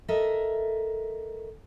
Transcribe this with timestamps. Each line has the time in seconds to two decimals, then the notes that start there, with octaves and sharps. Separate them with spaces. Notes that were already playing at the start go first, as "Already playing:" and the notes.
0.08 A4 A#4 D#5 E5